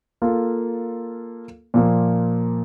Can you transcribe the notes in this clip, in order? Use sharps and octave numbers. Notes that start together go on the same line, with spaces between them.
A#3 F4 A4
A#2 F3 A#3